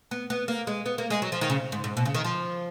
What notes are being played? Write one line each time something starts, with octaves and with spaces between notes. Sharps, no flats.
B3
B3
A#3
G#3
B3
A#3
G#3
F#3
F3
D#3
C#3
G#2
G#2
B2
C#3
D#3
F3